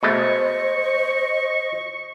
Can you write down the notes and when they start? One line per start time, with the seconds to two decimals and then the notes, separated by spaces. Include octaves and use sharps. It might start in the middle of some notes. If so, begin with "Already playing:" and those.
0.03 B2 G#3 A3 C5 D#5 C#6